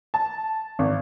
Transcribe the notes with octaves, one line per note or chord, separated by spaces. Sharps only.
A5
G#1